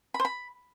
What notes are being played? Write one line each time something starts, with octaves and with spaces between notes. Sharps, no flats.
B5
C5
B5